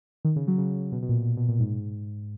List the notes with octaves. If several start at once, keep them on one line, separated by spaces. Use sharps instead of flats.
D#3
C#3
F#3
C#3
B2
B2
A#2
A#2
B2
A#2
G#2